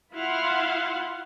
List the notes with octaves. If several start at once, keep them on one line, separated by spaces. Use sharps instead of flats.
E4 F4 F5 F#5 C6